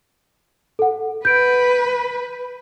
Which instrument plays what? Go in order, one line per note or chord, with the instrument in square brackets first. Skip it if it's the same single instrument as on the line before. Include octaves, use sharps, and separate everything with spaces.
[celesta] A4 F#5
[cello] B4 [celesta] G6 D7